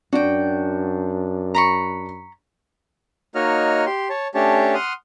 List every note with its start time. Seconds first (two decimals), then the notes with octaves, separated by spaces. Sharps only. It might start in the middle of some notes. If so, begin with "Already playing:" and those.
0.13 F#2 D4 F#4 D5 G5
1.55 A#5 B5 C#6
3.35 A#3 D#4 F#4 C#5 D#5 F6
3.86 G4 C6
4.10 C#5 A5
4.35 A3 C#4 D4 G4 C#5 A5
4.75 F#5 C6 D#6 F6